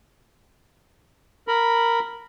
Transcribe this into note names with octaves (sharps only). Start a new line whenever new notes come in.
A#4 B5